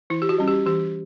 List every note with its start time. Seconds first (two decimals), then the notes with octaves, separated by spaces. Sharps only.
0.10 E3 E4
0.22 G4
0.29 F#4
0.38 G3 C#4
0.48 G4
0.66 E3 G4